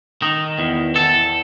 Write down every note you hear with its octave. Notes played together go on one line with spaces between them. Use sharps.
D#3 D#4
E2
E2 A4